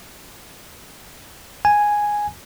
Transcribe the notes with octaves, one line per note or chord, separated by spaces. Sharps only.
G#5